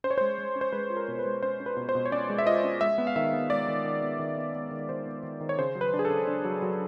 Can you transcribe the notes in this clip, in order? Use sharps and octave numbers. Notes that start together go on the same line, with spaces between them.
C#4 C5
C#5
G#3 C5
G#3
C#4
C5
G#3 B4
F4
A#4
B2
B4
G#3
C#4 C5
C#4
B4
B2
C5
B2
C#5
C#4 D5
G#3
E5
F4 D#5
C#4
G#3 E5
B3
F5
D#3 E5
B3
G#3 D5
D#3
D#3
B3
D#3
B3
B3
D#3
D#3 C5
B3
D#3
D#3
C#5
C#3 C5
F#3
B4
D4
G#4
A4
C#3
D4
F#3
F#3